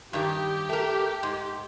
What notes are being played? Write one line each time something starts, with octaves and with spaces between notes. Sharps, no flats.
G2 D#3 G4
A3 A#4
G#2